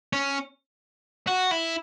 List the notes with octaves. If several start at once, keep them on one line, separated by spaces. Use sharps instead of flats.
C#4
F#4
E4